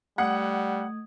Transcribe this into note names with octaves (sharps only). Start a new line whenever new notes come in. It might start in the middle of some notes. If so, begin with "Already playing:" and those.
G3 A3 F#5 D#6 G#6